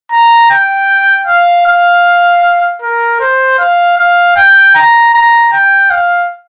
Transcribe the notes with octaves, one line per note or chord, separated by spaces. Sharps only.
A#5
G5
F5
F5
A#4
C5
F5
F5
G5
A#5
A#5
G5
F5